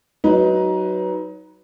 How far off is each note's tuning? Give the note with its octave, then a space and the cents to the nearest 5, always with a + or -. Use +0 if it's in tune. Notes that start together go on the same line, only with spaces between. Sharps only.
F#3 +20 D#4 +20 B4 +0